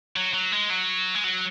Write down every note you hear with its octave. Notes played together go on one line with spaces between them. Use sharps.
F#3
F#3
G#3
F#3
G#3
F#3